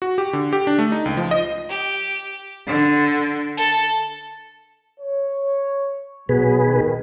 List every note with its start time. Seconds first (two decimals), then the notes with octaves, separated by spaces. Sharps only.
0.02 F#4
0.18 G4
0.33 D3
0.53 G4
0.67 D4
0.79 A3
0.92 D#4
1.06 C#2
1.17 F3
1.31 D#5
1.70 G4
2.67 D3
3.58 A4
5.00 C#5
6.29 B1 B2 F#3 G#4 B4
6.66 D#3